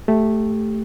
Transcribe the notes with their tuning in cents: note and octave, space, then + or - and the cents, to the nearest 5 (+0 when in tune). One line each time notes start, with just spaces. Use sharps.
A3 +0 G4 +10